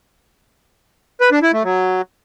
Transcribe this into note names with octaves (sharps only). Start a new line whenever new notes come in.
B4
D4
E4
A3
F#3